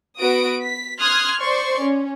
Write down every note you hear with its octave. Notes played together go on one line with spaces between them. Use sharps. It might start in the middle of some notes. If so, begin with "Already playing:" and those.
B3 F#4 B4 D#6 D7
B6
C6 D#6 F6 F#6 G#6
C5 D5 C6 C#6
C#4